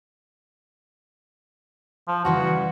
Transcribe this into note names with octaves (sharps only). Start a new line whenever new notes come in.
F3
C#3 E3 G3 F#4